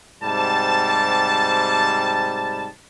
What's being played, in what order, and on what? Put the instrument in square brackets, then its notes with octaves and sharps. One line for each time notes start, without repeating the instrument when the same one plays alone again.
[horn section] G#2 C3 G3 A5